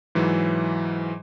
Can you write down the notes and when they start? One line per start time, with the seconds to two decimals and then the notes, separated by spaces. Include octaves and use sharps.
0.15 G#2 E3 F#3